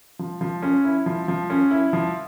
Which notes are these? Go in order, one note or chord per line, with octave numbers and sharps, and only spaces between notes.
F3
F3
C#4
E4
F3
F3
C#4
E4
F3